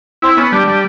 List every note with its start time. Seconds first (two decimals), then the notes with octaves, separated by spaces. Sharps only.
0.22 C4 E4
0.37 B3 C#4
0.52 G3 D4
0.68 G3